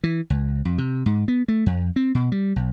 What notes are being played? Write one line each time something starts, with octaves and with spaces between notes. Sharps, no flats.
E3
C#2
F2
C3
G#2
B3
A3
F2
C4
B2
G3
B1